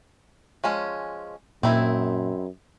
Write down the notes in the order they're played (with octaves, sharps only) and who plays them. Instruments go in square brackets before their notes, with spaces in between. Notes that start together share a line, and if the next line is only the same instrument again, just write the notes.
[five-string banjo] F3 G#3 C#4
[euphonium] F#2 [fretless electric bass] A#2 [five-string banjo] C4 D#4 E4